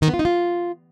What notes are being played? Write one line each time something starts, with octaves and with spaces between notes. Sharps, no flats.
D#3
B3
F4
D#4
F4